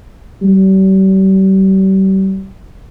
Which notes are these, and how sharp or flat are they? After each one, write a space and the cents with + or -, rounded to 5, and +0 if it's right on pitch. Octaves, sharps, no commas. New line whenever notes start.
G3 -40